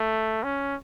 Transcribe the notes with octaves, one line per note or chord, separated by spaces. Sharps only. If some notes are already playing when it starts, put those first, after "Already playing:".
Already playing: A3
C#4